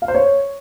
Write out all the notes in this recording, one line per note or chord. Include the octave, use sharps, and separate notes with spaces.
F5
C5
C#5